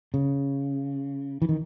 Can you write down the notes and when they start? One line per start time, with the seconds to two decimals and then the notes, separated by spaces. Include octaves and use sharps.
0.14 C#3
1.42 E3
1.49 D#3